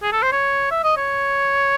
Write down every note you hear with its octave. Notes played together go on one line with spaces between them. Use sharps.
G#4
A4
C5
C#5
E5
D#5
C#5